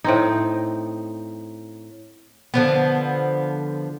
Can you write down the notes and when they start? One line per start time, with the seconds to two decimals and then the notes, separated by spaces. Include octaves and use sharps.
0.04 A2 C4 D#4
2.54 D3 F3 B3